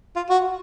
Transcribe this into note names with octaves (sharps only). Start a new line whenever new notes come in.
F4
F#4